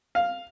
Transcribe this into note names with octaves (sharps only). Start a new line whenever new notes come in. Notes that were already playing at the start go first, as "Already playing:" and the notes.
F5